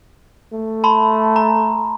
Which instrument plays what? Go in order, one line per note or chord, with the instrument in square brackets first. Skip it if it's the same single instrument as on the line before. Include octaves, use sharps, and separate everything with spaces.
[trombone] A3
[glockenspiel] A5 B5 C6
A#5